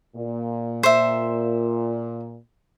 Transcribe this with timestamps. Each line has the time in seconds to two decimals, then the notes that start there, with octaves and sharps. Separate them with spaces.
0.16 A#2
0.83 C5 E5